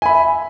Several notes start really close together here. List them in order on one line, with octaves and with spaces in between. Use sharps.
G#5 B5 E5